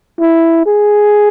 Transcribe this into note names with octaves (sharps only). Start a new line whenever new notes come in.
E4
G#4